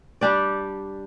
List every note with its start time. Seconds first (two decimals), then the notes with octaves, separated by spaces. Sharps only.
0.21 G3 D4 G4 D5